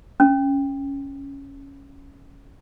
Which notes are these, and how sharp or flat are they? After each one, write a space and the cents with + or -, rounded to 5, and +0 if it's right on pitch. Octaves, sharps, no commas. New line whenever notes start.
C#4 +0